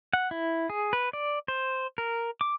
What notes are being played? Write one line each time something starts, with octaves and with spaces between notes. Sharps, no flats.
F#5
E4
G#4
B4
D5
C5
A#4
D6